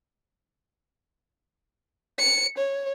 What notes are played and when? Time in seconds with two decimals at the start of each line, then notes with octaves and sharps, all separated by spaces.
2.19 C#7
2.58 C#5